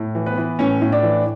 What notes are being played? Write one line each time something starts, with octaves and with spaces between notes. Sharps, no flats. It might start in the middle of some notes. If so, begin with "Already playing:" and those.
Already playing: A2
E3
B3 B4
E3
A2 C#4 C#5
A2
D4 D5
E3